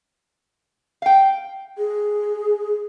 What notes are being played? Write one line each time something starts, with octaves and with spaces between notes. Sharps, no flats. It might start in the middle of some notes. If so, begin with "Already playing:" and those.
F5 G5
G#4